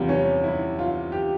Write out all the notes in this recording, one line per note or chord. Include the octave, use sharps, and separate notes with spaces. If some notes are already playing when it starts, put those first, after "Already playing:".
Already playing: E2 C3 G3 F4
C#4
E4
F4
G4